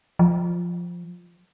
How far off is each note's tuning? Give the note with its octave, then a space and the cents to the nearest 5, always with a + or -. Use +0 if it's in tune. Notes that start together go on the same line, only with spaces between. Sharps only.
F3 +0